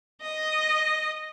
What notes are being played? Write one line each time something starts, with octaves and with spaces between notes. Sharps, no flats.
D#5